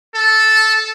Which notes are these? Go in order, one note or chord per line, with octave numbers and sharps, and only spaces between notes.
A4